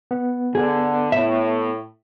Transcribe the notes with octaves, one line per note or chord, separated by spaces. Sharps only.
B3
D3 G#4
A2 E5